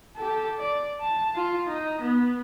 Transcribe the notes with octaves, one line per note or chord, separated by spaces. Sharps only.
G4 A4
D5
A5
F4
D#4
B3